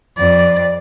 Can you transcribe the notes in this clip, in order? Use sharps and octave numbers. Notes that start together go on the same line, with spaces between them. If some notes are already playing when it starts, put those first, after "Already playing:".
F2 D5